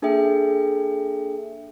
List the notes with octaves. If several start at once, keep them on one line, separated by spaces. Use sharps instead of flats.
A#3 D4 G#4 A4 E5 G5